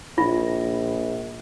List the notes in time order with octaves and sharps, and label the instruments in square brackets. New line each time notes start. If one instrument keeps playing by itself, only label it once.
[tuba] A#1 [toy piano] F4